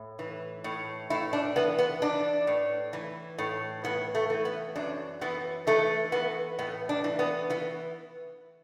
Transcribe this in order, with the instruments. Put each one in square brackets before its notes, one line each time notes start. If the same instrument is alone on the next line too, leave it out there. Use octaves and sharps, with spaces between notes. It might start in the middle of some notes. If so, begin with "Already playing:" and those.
Already playing: [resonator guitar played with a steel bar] A2
E3
A2
A2 E4
D4
E3 B3
B3
E3 D4
A2
E3
A2
E3 B3
A3
E3
B3
F#2 D4
E3 B3
E3 A3
E3 B3
A2 B3
D4
E3
B3
E3 B3